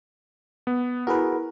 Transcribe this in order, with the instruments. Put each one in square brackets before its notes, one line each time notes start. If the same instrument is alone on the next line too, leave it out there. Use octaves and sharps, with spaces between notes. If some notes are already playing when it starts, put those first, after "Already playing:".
[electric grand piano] B3
[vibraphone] E4 [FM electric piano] F#4 G#4 B4 [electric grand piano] A#4